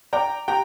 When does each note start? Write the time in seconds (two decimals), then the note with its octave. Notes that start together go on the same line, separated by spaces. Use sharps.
0.13 D5 G5 A#5
0.48 G4 G5 A#5